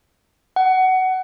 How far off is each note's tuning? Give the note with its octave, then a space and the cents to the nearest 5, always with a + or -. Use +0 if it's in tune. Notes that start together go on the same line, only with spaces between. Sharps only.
F#5 +20